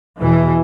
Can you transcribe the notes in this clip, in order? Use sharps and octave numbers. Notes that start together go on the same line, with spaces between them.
E2 B2 E3